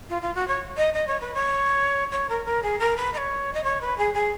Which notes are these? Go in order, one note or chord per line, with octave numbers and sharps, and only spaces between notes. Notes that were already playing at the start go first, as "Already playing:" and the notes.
F4
F4
F#4
C#5
D#5
D#5
C#5
B4
C#5
C#5
A#4
A#4
G#4
A#4
B4
D#5
C#5
D#5
C#5
B4
G#4
G#4